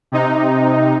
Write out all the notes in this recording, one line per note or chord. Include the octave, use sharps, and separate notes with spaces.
C3 D#4